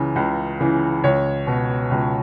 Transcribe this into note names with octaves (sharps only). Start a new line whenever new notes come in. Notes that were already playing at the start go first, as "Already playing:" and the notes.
Already playing: C#2 C#3 E3
C#2
C#3 E3
C#2 C#5
B2
C#2